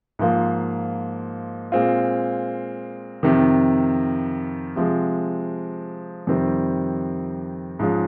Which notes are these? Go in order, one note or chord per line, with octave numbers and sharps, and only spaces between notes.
G#2 F3 A#3 F4
A#2 G#3 C4 F4
F2 C3 D#3
C3 F3 G#3
F2 C3 D#3 G3 C4
G#2 F3 G#3 C#4 F4